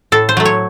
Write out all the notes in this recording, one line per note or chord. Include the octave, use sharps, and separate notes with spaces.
A2 A4
C5
F#3 A3
C#5